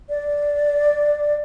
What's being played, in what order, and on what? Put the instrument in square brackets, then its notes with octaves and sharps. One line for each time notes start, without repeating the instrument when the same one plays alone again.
[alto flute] D5